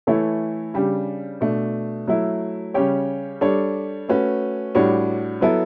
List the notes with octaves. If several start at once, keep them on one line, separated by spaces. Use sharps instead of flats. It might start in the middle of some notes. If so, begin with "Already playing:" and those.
E3 A3 E4 A4 C#5
C#3 G3 D4 G4
B2 A3 D4
F#3 A3 E4
C#3 G3 C#4 G4 C#5
G3 D4 A4 C#5
A3 C#4 F#4 B4
A2 G3 D4 F#4 C#5
F#3 B3 E4 A4